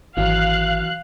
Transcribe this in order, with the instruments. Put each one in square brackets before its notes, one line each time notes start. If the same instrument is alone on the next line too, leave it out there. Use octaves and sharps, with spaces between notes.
[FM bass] G#1 [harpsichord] D#3 E3 F#3 [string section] F5 F#6